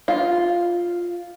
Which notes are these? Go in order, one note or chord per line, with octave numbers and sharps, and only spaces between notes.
F4